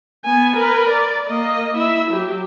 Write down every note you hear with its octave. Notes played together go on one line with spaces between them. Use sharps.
B3 G#5
A#4 B4
D5
A#3 D#5
E4 E5
F#3 G4